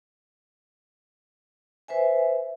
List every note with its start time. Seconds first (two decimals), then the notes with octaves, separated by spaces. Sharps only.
1.88 B4 C5 E5 G#5